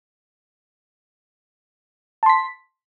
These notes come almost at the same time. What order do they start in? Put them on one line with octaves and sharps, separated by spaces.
A5 C6 B6